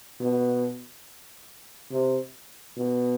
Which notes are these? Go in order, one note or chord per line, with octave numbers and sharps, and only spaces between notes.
B2
C3
B2